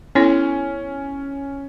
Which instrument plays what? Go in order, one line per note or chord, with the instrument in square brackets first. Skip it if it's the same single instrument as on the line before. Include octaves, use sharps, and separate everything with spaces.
[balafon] B3 E4 A4 C#5 [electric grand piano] C#4